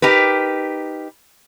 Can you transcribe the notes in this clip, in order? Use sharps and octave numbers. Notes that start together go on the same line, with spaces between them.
D#4 G4 A#4 B4